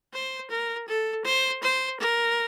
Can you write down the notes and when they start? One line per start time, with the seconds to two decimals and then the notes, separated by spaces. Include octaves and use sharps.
0.13 C5
0.50 A#4
0.88 A4
1.25 C5
1.63 C5
2.00 A#4